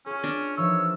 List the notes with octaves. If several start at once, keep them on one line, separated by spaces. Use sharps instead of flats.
C#4 F4 G#4
D4
E3 F3 D#4 C#5 E6